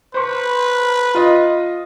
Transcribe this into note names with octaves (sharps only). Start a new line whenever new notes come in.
B4 C5 B5 C#6
F4 D#5